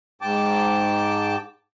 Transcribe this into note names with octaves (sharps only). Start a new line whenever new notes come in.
G#2 G5 A5 D6